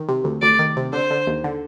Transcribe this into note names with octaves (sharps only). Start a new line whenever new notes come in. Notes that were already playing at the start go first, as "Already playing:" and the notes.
Already playing: D#3
C3
D2
D2 D5
D#3
C3
D3 C5
D3
D#2
D3